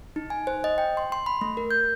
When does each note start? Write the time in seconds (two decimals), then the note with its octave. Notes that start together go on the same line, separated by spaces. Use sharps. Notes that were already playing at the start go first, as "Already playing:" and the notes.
0.16 D#4
0.30 G#5
0.47 C5
0.64 D#5
0.78 G5
0.97 C6
1.12 C6
1.26 B5
1.41 A3
1.57 A#4
1.71 G6